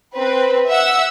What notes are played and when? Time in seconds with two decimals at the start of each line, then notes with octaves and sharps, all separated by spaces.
0.15 C4 B4
0.68 E5 F#5 E6